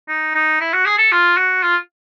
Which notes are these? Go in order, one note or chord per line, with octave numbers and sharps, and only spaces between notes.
D#4
D#4
E4
F#4
G#4
A4
F4
F#4
F4